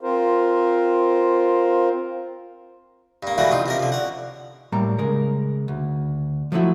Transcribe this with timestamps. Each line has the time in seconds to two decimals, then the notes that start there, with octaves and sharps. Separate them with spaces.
0.01 C4 F4 A#4 C5
3.23 G2 A#3
3.38 E3 G3 A3 A#3 F#4
3.51 A1 D#4 F4
3.66 C3 C#4 A#4
3.79 D3 F3
3.92 C#5 F#5
4.72 A2 G3 A#3 A#5
4.98 C#3 G#3 A#4
5.68 D2
6.52 F3 F#3 A3 E4 F#4